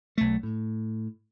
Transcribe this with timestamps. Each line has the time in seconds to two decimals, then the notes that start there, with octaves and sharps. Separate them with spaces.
0.18 B1 A3
0.43 A2